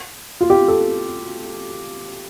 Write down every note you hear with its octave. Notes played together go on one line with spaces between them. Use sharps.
F4
G4
A4